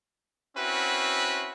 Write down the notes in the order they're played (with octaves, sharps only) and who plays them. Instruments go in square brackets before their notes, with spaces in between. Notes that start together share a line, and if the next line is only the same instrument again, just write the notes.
[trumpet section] C4 C#4 E4 F#4 B4